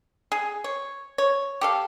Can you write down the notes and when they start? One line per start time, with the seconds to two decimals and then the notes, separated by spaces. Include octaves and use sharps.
0.32 G#4
0.64 C#5
1.18 C#5
1.61 G4 A4 F5